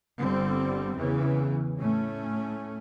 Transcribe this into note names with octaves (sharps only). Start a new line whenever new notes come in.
G1 D3 G3 C4
E2 C#3 E3
A2 A3 C#4